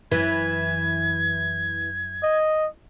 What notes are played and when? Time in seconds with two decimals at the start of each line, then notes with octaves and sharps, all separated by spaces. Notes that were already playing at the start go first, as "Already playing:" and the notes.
0.12 F#2 E3 G#6
2.23 D#5